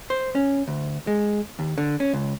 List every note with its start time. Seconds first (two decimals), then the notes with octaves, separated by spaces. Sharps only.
0.10 C5
0.35 C#4
0.68 D2
1.07 G#3
1.59 D#2
1.78 D3
2.00 C#4
2.13 C#2